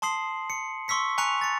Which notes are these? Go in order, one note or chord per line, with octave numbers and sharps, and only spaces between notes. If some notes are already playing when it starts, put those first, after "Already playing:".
A5 C6 D#6 C7 F#7
C#7
C6 C#6 E6 B6 C#7
G#5 A#5 C#6 F#6 C#7 F7
A6 C#7